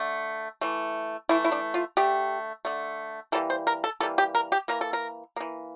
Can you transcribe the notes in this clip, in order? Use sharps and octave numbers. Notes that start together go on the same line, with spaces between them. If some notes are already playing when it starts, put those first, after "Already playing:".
Already playing: D3 A3
E3 A3
E3 A3 E4
E4
D4
F4
D3 A3 G4
D3 A3
E3 G3 A#3 A4
C5
A#4
A4
E3 G3 A#3 A4
G4
A#4
G4
E3 A#3 A#4
A4
A#4
E3 A#3